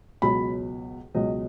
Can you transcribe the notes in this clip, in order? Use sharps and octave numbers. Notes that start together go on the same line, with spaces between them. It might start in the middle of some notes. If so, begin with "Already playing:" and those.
C#2 B2 F#3 B5
C#2 B2 F#3 D#5